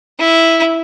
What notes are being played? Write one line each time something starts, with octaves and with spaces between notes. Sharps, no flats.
E4